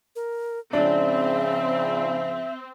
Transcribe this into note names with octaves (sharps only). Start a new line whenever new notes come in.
A#4
G#2 C#3 F3 C4 D4 E5